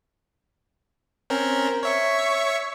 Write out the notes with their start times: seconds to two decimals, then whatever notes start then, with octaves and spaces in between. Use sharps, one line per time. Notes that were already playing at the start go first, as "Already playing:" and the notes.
1.30 C4 C#4 A#4
1.83 C#5 E5 C#6